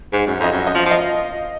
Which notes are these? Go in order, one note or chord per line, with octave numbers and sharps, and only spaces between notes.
G#2
F#2
F2 D#5
F#2
D#5
F3 F5
F3
D#5